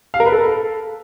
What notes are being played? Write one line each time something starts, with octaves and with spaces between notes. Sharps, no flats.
F5
A#4
B4
A4